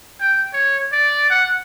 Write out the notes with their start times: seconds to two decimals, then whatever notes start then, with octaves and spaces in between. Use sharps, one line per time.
0.20 G5
0.53 C#5
0.93 D5
1.30 F#5